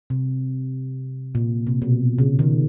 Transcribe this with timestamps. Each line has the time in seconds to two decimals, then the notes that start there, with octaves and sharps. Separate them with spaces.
0.10 C3
1.35 A#2
1.67 C3
1.82 B2
2.19 C#3
2.39 D#3